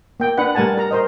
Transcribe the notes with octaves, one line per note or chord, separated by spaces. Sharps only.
A#3 G5
D4 B4 F#5
G3 A3 A#4 F#5 G#5 A5
A#4 A#5
A#4 C5 D#5